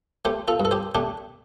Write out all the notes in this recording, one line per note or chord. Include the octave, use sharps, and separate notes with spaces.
A3 G4 C5
F4 A4
G2
A4
G4 C5
A3 D4 G4